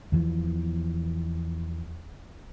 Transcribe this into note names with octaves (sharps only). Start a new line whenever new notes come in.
E2 E3 F3